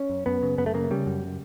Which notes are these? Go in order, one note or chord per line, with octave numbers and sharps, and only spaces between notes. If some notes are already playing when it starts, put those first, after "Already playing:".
Already playing: C#4
F#2
F#2 B3
C#3
F#2 B3
A3
C#3 A#3
C#3 G3
F#2